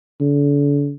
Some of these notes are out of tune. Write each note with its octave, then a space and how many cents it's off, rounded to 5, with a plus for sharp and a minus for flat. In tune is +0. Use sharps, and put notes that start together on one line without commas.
D3 -40